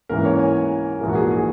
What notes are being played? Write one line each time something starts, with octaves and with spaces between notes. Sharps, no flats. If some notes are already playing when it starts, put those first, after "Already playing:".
G#2 E3 A#3 C#4 A#4
C#5
G#5
G#5
A#1 G#2 E3 A#3 A#4
F#4
G#4
G#4